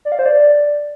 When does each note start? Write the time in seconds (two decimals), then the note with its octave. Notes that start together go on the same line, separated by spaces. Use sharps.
0.05 D5
0.12 F5
0.19 C5
0.26 D5